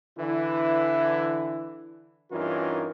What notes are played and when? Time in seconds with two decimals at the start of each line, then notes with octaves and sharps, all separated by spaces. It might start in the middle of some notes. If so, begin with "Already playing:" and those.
0.18 D3 E3 E4
2.31 G2 E3 C#4 D#4 F4 A#4